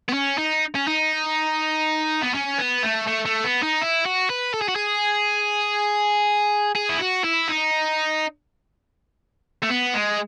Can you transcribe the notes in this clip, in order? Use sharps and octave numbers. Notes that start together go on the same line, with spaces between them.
B3
C#4
D#4
C#4
D#4
B3
C#4
B3
A3
A3
A3
B3
D#4
E4
F#4
B4
A4
G#4
F#4
G#4
G#4
E4
F#4
E4
D#4
A3
B3
G#3